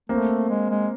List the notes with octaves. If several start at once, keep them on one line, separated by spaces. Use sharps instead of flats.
A3 A#3 C4
G#3
G#3